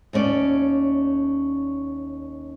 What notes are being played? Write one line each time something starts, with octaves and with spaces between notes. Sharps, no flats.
D#2 A3 C#4 D5